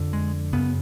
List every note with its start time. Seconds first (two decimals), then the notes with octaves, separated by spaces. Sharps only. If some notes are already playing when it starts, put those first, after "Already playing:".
Already playing: F2 D3
0.13 G#3
0.53 F#2 C#3 B3